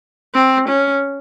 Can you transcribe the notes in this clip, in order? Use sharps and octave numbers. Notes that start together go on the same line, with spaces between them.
C4
C#4